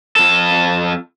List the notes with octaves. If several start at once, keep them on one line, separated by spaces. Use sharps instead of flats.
F2 A4